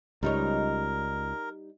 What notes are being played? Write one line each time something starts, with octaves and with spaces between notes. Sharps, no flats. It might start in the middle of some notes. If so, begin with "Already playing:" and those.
C#2 G3 D#4 A#4 C#5